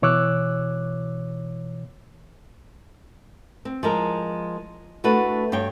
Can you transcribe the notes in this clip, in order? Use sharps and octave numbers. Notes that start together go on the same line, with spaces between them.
B2 E3 C#5 D6 E6 F#6
C4
F3 G#3 A#4
A3 D4 F#4 B4
G2 G4 C#5 G5